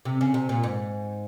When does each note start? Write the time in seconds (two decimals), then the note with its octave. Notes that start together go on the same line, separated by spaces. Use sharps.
0.05 C3
0.21 C#3
0.34 C3
0.49 A#2
0.63 G#2